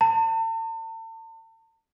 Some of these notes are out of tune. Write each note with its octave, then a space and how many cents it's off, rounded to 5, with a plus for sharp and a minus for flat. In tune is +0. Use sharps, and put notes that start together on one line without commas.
A5 +40